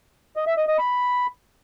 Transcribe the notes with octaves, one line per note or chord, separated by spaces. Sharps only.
D#5
E5
D#5
D#5
B5